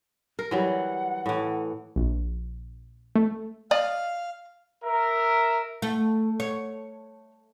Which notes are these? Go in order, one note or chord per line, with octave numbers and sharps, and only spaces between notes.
A#4
E3 F#3 G3 F#5
A2 E3
A#1
A3
D5 D#5 F5
A#4 E5
A3
C#5